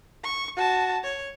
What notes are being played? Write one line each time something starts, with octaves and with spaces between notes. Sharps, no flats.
C#6
F#4 A5
C#5